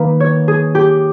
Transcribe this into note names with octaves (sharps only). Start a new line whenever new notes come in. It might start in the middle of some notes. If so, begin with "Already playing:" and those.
Already playing: D#3 A#3 B4
C#5
G#4
G4